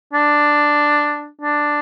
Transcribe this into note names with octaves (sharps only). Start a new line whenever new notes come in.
D4
D4